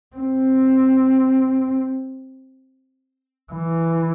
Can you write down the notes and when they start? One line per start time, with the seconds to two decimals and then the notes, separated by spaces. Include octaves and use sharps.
0.16 C4
3.52 E3